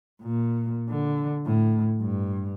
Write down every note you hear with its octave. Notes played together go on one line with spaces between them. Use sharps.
A#2
D3
A2
G2